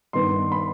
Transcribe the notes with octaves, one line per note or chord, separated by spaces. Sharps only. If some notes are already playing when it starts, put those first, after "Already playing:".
G2 D#3 B3 C6
B5